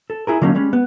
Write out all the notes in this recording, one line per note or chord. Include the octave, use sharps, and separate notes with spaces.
A4
E4 G#4 A#4
D3 F#3 A#3 C#4 D#4
G3 G#3 C#4
B3